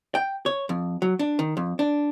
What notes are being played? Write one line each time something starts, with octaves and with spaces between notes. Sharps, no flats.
G5
C#5
F2
F#3
D4
D#3
F2
D4